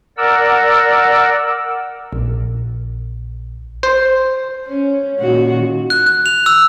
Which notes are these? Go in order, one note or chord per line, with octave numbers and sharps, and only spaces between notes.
A#4 D5 F#5 E6
A#1
C5
C#4
A#2 D#3 F#4
F#6
F#6
F7
E6